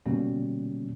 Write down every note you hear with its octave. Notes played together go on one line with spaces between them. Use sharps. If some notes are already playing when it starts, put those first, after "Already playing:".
B2 D3 G3 A#3 C#4